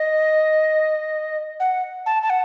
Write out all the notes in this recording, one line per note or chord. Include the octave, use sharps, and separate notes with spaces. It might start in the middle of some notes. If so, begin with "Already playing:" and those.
Already playing: D#5
F#5
A5
A5
F#5